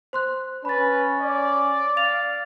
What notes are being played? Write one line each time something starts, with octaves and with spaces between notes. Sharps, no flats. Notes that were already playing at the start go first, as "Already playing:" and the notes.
C5 C6 F#6
C#4 B4 B5 A6
D5
F5 A6 F7